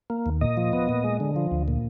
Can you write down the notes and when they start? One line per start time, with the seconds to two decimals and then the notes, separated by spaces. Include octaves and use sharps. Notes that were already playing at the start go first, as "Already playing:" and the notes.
0.10 A#3
0.26 D#2
0.41 A#2 D#5
0.57 F3
0.73 B3
0.89 A#2
1.04 G#3
1.20 D3
1.36 F3
1.52 D2
1.68 A#2